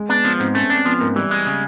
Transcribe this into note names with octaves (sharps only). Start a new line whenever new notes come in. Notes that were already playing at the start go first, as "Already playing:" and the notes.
Already playing: G#3
B3 D4
F3 B3
G#2 C4
A3 C#4
C4 D4
F3 B3
G#2 A#3
E3 G3
G#3
C#3